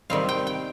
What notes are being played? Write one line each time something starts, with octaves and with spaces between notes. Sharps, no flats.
C3 D#3 G3 C4 F5
G5
G5